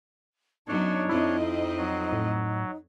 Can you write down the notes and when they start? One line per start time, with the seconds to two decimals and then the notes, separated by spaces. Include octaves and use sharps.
0.67 F#2 F#3 B3 D4 D#4 C#5
1.09 F2 C4 E4 D#5
1.77 F#3
2.13 A2